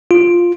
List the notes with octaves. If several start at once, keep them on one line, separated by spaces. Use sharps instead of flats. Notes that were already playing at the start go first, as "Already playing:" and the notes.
F4